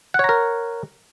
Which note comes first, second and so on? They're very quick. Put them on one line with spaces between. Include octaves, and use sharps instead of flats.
F#5 C#5 A#5 A#4